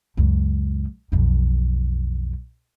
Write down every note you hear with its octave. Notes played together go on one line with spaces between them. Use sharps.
C#2 F#2
B1 F2